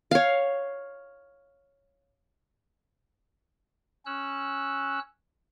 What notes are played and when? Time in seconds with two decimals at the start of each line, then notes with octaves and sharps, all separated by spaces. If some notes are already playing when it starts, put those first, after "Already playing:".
0.11 C#5 F5
4.06 C#4 E6 F#6